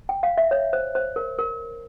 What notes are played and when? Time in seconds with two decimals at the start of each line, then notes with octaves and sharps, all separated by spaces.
0.09 G5
0.23 F5
0.37 E5
0.51 C#5
0.73 C5
0.95 C5
1.16 A#4
1.39 A#4